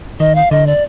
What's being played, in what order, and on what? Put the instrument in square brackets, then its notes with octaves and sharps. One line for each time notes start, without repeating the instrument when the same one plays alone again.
[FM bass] D#3 [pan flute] D#5
[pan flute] F5
[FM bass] D3 [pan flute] D#5
[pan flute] D5